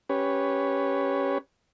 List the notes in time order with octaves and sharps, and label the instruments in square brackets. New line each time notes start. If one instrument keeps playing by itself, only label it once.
[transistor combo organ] C#4 G4 B4 C#5